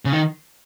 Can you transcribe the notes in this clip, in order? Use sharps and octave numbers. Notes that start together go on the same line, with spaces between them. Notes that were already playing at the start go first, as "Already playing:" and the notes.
C#3
D#3